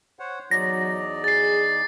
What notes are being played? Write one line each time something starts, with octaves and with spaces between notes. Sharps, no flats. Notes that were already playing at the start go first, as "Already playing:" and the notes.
C5 C#5 F#5
E2 F#3 D#4 D5 A#6
G#4 A6 C7